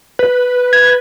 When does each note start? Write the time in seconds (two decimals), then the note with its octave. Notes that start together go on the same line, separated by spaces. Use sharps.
0.19 B4
0.73 G#6